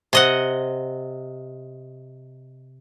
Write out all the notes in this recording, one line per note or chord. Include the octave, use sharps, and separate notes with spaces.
C3 D#5 F#5